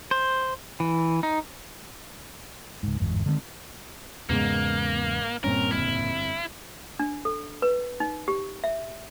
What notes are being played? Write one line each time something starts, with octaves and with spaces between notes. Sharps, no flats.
C5
E3
D#4
C#2 G#2
G1 E2 G#2
D3 D#3 G#3 C4
E2 G#2 C#3 G#3 A#3 B3
D#1 G2 A#2 C4 C#4 A#4
G1 F2 E4 F6
D4
A4
B4
D#4
G4
E5